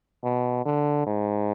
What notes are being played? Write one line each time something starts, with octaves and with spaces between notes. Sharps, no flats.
B2
D3
G#2